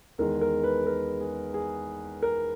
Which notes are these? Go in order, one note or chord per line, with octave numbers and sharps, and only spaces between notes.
E2 D#3 G#3 A#4
A#4
B4
A#4
G#4
G#4
A#4